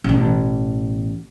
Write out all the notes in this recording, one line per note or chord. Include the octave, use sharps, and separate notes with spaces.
A1 B2